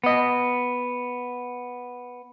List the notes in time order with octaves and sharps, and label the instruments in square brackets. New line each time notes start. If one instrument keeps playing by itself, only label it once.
[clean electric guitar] B3 D#5